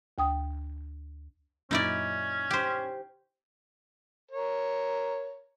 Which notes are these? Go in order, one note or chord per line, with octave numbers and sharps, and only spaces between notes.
D2 G5 D#6
F#2 A#2 C#4 D#4 E4 D5
G4 C5
A#4 C#5